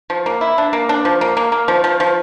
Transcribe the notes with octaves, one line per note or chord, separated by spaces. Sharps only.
F3
A#3
E4
D4
A#3
D4
F3
A#3
A#3
A#3
F3
F3
F3